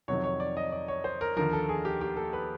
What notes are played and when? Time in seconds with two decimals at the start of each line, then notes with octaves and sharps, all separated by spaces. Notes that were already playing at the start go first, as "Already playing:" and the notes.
0.08 F2 C3 D#3 F#3 C#5
0.24 C#5
0.40 D5
0.57 D#5
0.72 D5
0.88 C#5
1.04 C5
1.21 A#4
1.36 D#2 D3 F3 A#4
1.53 A4
1.69 G#4
1.85 G4
2.01 G4
2.17 A4
2.33 B4